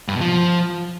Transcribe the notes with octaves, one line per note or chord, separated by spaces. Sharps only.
G2
B2
F3